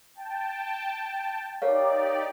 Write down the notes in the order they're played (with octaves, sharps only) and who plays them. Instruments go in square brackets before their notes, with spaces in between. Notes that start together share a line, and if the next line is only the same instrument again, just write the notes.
[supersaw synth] G5 A5
[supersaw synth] D#4 G4 D5 [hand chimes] A#4 C#5 F5